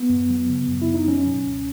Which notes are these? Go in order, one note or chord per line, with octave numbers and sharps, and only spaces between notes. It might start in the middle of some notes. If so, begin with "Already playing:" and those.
Already playing: B3
F#2
F#3
C#3
F#2
E4
F#2
D#4
F#3 C#4
B2
C#2